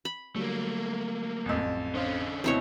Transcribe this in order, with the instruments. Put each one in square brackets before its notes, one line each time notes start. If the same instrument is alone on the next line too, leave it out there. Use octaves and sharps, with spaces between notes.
[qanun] B5
[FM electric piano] D3 F#3 G3 [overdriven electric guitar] A3 A#3
[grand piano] A1 F2
[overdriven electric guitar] D3 C#4 [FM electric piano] C5 D#5 F5
[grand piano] D2 B2 [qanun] C4 E4 C#5